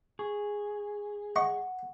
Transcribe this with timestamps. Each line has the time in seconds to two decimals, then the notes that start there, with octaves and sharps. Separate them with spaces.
0.19 G#4 C#6
1.36 D#5 F#5 C#6